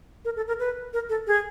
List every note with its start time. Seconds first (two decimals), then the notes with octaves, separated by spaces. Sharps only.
0.25 A#4
0.36 A4
0.48 A#4
0.59 B4
0.93 A#4
1.09 A4
1.27 G#4